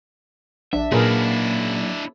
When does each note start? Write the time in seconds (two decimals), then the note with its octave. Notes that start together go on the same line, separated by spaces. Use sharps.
0.73 A#1 D4 E5
0.92 F#2 A#2 A#3 D4 E4 G#4 A#4 B4